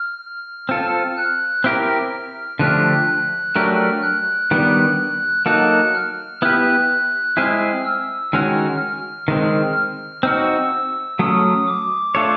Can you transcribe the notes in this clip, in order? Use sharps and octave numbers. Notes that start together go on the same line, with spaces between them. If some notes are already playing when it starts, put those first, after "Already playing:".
Already playing: F6
C4 F4 A4
F#6
C4 E4 G4 A#4 F6
D3 F3 A3 D4 G4 F#6
F#3 A3 D4 G4 A#4 F6
F#6
D#3 G3 B3 D4
F#3 A#3 D#4 F#4 A4 F#6
F6
B3 E4 G4 B4 F#6
G#3 C4 E4 G#4 F6
E6
D#3 G#3 C#4 F#4 F6
F6
D#3 G#3 C4
F6
C4 D#4 F#4 E6
F#3 A3 C#4 D#6
D6
A3 D4 F4 A4 C#5